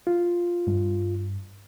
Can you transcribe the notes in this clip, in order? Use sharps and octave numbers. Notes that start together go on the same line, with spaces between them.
F4
G2